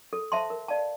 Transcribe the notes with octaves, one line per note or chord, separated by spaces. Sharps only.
A4
C5 E5 A5 C6
A#4
D5 F5 A5